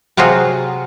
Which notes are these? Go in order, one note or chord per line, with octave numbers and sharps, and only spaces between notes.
C3 F#3 F4 F#4 G#4